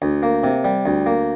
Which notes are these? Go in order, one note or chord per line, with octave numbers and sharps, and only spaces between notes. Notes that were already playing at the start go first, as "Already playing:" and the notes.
D2
A#3
C3
G3
D2
A#3